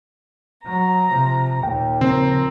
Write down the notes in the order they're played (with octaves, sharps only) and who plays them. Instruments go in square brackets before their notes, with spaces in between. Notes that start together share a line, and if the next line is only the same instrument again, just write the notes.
[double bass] F#3 [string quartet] A#5
[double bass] C3 F3
[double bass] D#2 A#2 [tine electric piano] G5
[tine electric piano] C#3 [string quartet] F3 A#4 [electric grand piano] C4